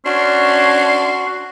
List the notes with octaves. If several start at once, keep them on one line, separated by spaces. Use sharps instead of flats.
C#4 D4 F#4 C6